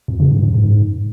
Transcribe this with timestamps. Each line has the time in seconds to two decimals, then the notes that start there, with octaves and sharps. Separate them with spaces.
0.08 F2
0.20 C#3
0.31 G2
0.43 F#2
0.54 G#2